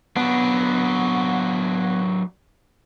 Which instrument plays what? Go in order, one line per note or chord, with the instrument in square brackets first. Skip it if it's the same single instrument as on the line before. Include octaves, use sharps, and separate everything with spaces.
[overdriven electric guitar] F#3 D4 [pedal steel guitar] B3